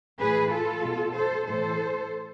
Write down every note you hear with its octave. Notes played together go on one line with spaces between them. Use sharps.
A2 E3 G#4 B4
F4 A4
B2
A4 C5
A2 E3 A4 C5